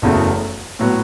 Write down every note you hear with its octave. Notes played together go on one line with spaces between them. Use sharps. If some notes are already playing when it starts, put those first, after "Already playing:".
F#1 E2 C#3 F#3 A3
A2 F#3 B3